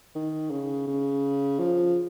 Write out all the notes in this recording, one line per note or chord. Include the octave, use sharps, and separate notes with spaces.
D#3
C#3
C#3
F3